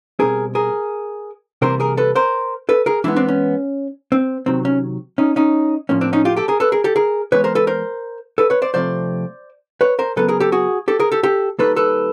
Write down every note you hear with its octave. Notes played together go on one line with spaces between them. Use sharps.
B2 G3 C4 G#4 A#4
G#4 A#4
C3 E3 G3 A#3 A#4 C5
G#4 A#4
A4 B4
A#4 C5
A4 B4
G#4 A#4
E3 G#3 B3 D4 E4
C4 D4
C#4
C4
C3 D#3 F#3 C4
C#4
C#4 D#4
C#4 D#4
A2 F3 A#3 C#4
C4 D4
C#4 D#4
F4 G4
G4 A4
G#4 A#4
A4 B4
G#4 A#4
G4 A4
G#4 A#4
E3 G#3 B3 B4 C#5
A#4 C5
A4 B4
A#4 C5
A4 B4
B4 C#5
C5 D5
C3 F3 A3 C4 C5 D5
B4 C#5
A#4 C5
C#3 F#3 B3 A4 B4
G#4 A#4
G4 A4
F#4 G#4
G4 A4
G#4 A#4
G4 A4
G4 A4
D#3 G3 A#3 A4 B4
A4 B4